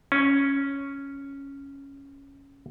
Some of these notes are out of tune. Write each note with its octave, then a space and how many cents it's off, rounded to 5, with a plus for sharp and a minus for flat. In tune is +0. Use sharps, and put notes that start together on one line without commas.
C#4 +0